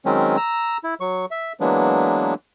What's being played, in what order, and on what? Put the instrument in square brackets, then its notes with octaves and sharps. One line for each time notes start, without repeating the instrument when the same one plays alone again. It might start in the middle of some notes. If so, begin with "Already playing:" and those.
[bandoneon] D#3 F#3 G#3 C4 C#4
A#5 E6
E4
F#3 C#6
E5
E3 F#3 G#3 A#3 B3 D4